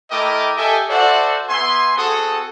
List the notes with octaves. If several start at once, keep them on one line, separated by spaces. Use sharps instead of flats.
A3 E4 A#4 D#5 G5 D6
G4 A4 D#5 E5 G5 G#5
F#4 A4 C5 D5 E5 F#5
B3 E5 G#5 C6
C4 F#4 G#4 A4 F#5 D#6